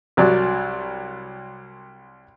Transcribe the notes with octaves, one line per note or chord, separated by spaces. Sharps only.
C2 F#3 D5